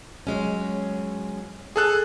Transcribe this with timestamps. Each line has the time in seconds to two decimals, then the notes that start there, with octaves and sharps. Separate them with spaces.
0.27 F#3 G#3 C#4
1.76 G#4 A4 F#6